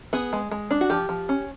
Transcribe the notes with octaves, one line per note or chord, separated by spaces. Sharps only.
B3 G#4
G#3
G#3
D4
F#4
F3 G4
F3
C#4